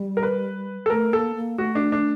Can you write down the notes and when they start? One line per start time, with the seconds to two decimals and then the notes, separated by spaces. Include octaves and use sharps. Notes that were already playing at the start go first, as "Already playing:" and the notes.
Already playing: G3
0.17 A#4
0.23 B4
0.86 A4
0.90 A3 A#4
1.13 A#3 A4
1.36 A#3
1.58 A3 F#4
1.75 D4
1.92 D4